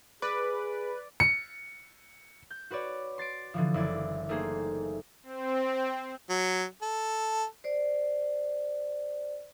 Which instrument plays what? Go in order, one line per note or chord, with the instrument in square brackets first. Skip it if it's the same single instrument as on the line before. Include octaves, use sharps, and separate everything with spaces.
[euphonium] G#4 [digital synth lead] B4 [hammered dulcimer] D5
[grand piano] C#7
[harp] G6
F#4 B4 C#5 D5
C6 A6 C7 D7
D3 E3 F3
F#1 E4 D5
A3 A#3 D#4 G#4 C5
[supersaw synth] C4
[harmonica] F#3
A4
[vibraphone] C5 D5